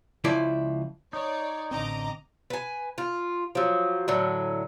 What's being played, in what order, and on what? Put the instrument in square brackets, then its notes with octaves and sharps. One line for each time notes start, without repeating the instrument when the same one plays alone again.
[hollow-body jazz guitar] C#2 F3 E4 D5
[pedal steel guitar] D#4 [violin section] C#5 D5
[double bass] A1 D3 [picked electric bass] C4 [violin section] D#5 A#5 D6
[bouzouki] B4 G#5
F4
F3 F#3
A2 D3 F#3